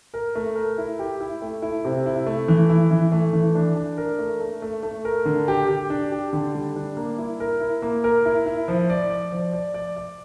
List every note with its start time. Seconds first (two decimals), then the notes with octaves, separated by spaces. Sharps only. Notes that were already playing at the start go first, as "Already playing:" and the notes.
0.14 A#4
0.35 A3
0.56 A#4
0.78 E4
0.99 G4
1.21 E4
1.42 A3
1.62 E4
1.85 C3
2.06 E4
2.26 A3
2.48 E3
2.69 E4
2.91 E3
3.12 A3
3.33 E3
3.55 D4
3.76 D4
3.97 A#4
4.19 A3
4.40 A3
4.62 A3
4.83 A3
5.05 A#4
5.25 D3
5.48 G4
5.68 G4
5.90 D4
6.12 G4
6.33 D3
6.55 G3
6.76 D4
6.97 A#3
7.18 E4
7.40 A#4
7.60 E4
7.82 A#3
8.04 A#4
8.25 E4
8.46 E4
8.68 F3
8.90 D5
9.10 D5
9.32 F3
9.53 D5
9.74 D5
9.96 D5